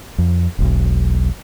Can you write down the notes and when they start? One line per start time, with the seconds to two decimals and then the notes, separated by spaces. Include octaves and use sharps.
0.18 F2
0.58 E1 B1